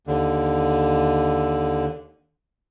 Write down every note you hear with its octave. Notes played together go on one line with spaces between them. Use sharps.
D#2 D3